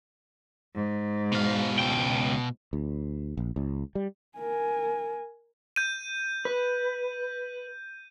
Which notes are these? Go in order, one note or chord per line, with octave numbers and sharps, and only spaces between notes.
G#2
B2 F5
C#2 G5
D2
A#1
C#2
G3
A#4 G#5
G6 D#7
B4